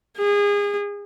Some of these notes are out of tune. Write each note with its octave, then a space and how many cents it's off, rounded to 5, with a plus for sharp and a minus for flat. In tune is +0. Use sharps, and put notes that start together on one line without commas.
G#4 -30